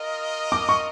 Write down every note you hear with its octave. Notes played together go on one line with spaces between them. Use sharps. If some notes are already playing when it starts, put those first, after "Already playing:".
Already playing: F4 A#4 D#5
D6
C#6